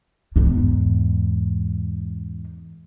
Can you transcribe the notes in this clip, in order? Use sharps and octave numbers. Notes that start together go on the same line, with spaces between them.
E2 G#2